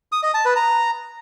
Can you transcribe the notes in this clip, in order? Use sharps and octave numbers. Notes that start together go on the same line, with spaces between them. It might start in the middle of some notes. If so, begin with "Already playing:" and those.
D#6
D#5
A5
B4
A#5